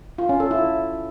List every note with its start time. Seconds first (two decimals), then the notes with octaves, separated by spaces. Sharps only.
0.18 F4
0.29 C#4
0.40 A4
0.51 E4